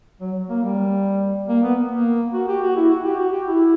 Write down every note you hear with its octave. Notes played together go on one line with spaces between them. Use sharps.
F#3
A#3
G3
A#3
B3
A#3
F#4
G4
F#4
E4
F#4
G4
F#4
G4
E4